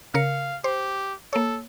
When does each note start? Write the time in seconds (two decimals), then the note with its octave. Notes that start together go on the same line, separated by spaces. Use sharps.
0.14 C#3 A#4 F5 C#7
0.64 G4 C5
1.33 A#3 A4 C#5